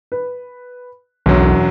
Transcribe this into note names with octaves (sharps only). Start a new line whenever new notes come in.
B4
E1 B1 F#2 F#3